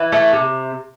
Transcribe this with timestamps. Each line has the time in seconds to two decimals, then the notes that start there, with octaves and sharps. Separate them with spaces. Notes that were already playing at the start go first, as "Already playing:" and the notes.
Already playing: E3
0.12 A3
0.32 C3